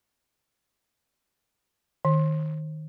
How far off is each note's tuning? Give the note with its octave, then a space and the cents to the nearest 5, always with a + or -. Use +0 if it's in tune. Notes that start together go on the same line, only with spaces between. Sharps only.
D#3 -5